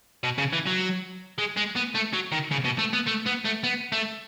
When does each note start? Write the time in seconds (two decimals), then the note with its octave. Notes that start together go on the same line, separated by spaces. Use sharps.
0.24 B2
0.38 C#3
0.53 E3
0.66 F#3
1.38 G#3
1.57 G#3
1.76 B3
1.95 A3
2.13 F#3
2.32 D#3
2.51 C#3
2.65 B2
2.79 A3
2.93 B3
3.07 A3
3.27 B3
3.45 A3
3.64 B3
3.92 A3